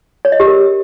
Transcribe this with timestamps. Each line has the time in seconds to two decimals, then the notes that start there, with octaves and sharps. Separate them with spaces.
0.25 C#5
0.32 D#5
0.40 G4
0.47 A#4